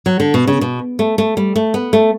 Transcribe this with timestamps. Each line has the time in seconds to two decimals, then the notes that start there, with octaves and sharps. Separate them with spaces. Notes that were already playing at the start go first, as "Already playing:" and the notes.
0.06 F#3
0.20 D3
0.34 B2
0.47 C#3
0.61 B2
0.99 A3
1.18 A3
1.37 G3
1.56 A3
1.74 B3
1.93 A3